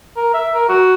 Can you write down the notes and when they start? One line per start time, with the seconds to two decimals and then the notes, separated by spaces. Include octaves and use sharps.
0.17 A#4
0.34 E5
0.54 A#4
0.69 F#4